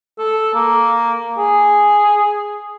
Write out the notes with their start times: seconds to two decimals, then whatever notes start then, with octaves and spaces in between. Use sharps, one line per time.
0.19 A4
0.54 A#3
1.37 G#4